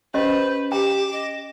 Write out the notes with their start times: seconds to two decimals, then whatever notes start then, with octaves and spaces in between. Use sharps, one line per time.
0.14 C#4 G4 B4 C5 D#5
0.72 G4 G5 D6 E7
1.12 D#5